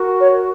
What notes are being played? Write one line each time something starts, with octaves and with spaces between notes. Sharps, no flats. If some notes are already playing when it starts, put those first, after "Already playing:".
Already playing: F#4 A#4
C#5